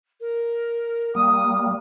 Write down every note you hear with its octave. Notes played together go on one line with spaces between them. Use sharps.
A#4
G3 A#3 D#6